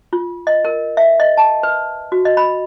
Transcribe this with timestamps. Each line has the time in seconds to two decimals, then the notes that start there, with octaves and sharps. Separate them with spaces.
0.13 F4
0.47 D#5
0.65 A#4
0.97 E5
1.20 D#5
1.37 A5
1.63 B4
2.12 F#4
2.25 D#5
2.37 B5